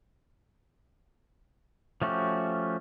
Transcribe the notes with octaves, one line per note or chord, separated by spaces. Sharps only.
F3 A3 C#4 F#4 G4